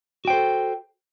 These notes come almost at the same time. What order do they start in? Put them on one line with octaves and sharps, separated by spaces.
F#4 G5 C5 A4